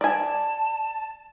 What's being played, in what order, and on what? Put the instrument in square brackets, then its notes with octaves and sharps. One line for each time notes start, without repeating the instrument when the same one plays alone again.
[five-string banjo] D5 G#5 [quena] A5